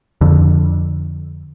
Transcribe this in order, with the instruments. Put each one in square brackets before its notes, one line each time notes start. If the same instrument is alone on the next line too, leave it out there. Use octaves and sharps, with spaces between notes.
[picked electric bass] F2 D3